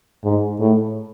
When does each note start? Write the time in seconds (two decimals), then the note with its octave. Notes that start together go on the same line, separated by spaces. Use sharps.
0.24 G#2
0.60 A2